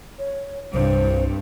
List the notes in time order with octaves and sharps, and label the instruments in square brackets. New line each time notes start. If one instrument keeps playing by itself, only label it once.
[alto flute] C#5
[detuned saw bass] C2 [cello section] G2 [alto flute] C5